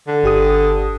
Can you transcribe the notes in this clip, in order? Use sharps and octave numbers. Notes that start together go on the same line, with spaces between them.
D3
G1 G4 D#6